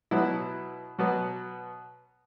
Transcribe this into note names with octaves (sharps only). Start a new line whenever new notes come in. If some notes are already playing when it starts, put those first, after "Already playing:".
B2 F#3 B3 E4
B2 F#3 B3